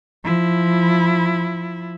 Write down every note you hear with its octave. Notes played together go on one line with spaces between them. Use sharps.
F3 E4